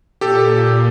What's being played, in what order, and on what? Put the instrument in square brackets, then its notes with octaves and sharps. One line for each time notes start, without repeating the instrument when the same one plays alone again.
[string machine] A#2 [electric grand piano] G4 A4